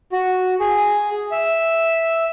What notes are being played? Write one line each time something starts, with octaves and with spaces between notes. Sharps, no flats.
F#4
G#4
E5